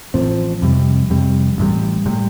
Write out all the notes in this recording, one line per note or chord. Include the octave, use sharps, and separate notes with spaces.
A1 A2 F3 C4
F2 C3 G3
F2 C3 G3
A1 A2 G3
A2 G3